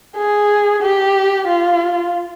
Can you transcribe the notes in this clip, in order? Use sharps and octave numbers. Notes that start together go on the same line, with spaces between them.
G#4
G4
F4